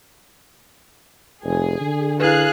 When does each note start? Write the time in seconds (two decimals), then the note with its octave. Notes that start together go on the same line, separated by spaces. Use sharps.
1.44 F1 G#4
1.81 D3
2.20 E4 G#4 B4 F5 F#6